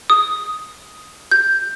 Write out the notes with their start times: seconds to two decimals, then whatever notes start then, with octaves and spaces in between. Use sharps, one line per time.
0.10 D#6
1.31 G6